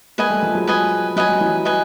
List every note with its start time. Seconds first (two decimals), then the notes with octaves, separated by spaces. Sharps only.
0.18 G#3 A#3 B4 D#5 G#5
0.30 G3 A3
0.43 F3 G3
0.55 F#3 G#3
0.67 B4 D#5 G#5
1.16 F#3 B4 D#5 G#5
1.29 G3
1.40 E3 F#3
1.65 B4 D#5 G#5